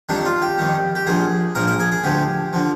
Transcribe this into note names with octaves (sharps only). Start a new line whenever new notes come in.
F2 D#3 G3 D4
F4
G4
F2 D#3 G3
G4
A#1 A#2 F3 G#4
A#1 A#2 F3 A#4
A#4
G#4
G#4
D2 D3 F3 G4
D3 F3